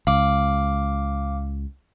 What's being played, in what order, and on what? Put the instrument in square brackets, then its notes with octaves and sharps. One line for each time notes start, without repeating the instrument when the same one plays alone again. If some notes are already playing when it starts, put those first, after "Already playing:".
[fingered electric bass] C#2 [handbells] F5 D6